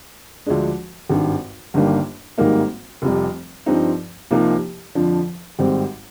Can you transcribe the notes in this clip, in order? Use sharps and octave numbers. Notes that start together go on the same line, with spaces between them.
D2 D3 F3 G#3 D4
G#1 G2 D#3
G1 G2 D#3 G3 A#3
G#1 G#2 G3 A#3 D#4
F1 F2 C3 G3
G2 F3 C4 D#4
C2 C3 F3 A#3 D#4
F2 D3 F3
G#1 G#2 G3 C4